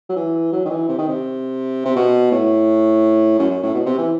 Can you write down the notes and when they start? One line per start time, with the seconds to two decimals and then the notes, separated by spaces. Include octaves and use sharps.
0.09 F#3
0.16 E3
0.52 F#3
0.65 D#3
0.70 E3
0.89 C3
0.98 D#3
1.08 C3
1.85 C3
1.96 B2
2.32 A2
3.39 F#2
3.50 F#2
3.63 A2
3.74 B2
3.86 C3
3.98 E3